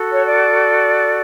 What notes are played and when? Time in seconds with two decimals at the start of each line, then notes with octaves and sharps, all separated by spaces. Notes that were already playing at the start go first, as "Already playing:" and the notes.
Already playing: F#4 A4
0.10 C#5
0.25 D5